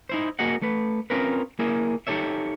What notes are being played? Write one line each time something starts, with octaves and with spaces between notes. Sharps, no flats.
D#4 E4 C5
A#3 F#4 G#4 D#5 F#5
A3 B4
C4 C#4 F4 G#4 A#4 B4
A#3 E4 G#4
D#4 G4 A4 C#5 E5